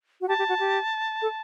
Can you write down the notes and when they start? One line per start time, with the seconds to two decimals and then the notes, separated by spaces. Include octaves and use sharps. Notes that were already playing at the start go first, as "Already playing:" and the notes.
0.21 F#4
0.28 G4 A5
0.39 G4
0.49 F#4
0.60 G4
1.22 A4